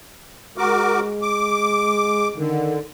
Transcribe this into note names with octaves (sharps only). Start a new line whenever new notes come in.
G#3 F#4 A#4 D6
D6
D3 D#3